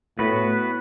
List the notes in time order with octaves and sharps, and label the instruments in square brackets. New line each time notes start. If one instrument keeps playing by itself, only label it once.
[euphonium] A2 [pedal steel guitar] B3 F#4 B4